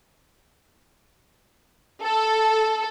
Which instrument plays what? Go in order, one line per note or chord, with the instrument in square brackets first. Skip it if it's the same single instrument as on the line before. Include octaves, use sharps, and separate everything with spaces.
[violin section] A4